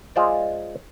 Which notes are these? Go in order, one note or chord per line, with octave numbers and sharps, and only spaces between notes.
G#3 F4 C5 D5